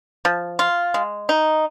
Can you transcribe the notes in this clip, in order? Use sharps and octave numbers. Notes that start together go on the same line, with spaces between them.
F3
F4
G#3
D#4